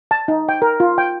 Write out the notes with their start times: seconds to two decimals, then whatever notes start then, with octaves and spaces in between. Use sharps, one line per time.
0.11 A5
0.28 D#4
0.49 G5
0.62 A#4
0.80 F4
0.98 G5